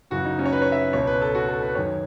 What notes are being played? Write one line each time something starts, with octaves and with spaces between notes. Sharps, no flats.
F#2 C#3 E3 F#4
D#4
C#4
C#5
B4
C#5
E5
C#2 B2 C#5
B4
A4
F#4
A4
B4
F#2 D#3 C#5